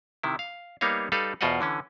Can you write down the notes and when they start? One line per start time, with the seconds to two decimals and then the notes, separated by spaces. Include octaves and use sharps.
0.23 C3 D#3 E4
0.39 F5
0.81 G3 A#3 B3 D#4 C#5 F5
1.12 G3 D#4 A4 B4 F5
1.41 E2 B2 F4 C5 D#5 F#5
1.61 D3 E3 C#4